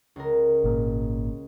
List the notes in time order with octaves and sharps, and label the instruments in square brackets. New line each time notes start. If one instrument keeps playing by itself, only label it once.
[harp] C#2 A#4
[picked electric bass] G#1 A#2